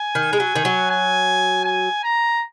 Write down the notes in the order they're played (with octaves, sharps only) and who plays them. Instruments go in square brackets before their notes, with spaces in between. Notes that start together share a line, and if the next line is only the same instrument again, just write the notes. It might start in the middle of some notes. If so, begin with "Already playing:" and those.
Already playing: [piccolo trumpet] G#5
[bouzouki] D#3
G#3
F#3
D#3
F#3
[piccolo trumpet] G#5
G#5
A#5